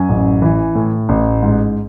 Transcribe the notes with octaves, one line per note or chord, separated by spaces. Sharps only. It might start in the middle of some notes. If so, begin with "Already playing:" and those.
Already playing: F#2 G#5
A1
E3
A2
A1
G#2